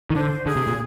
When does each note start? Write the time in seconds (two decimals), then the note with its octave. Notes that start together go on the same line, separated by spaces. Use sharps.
0.10 D#3
0.15 D3 C5
0.46 D3 G#4
0.56 C3
0.67 A#2